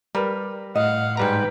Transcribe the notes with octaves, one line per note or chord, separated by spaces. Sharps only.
G3 A#4 B4
A2 D#5 F5 F#5
G#2 G3 B4 G5 A#5